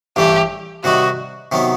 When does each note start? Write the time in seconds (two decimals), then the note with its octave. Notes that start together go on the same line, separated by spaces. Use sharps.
0.16 A1 G2 E3 A3 G4
0.84 C3 D#3 G3 D#4 F#4
1.52 C3 D#3 F#3 B3